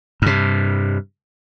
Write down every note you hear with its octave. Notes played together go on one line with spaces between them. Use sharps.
G2 C3